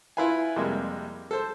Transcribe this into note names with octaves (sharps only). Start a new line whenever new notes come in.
E4 F4 B4 F5 G#5
F2 C3 G3 G#3 A#3
A4 C5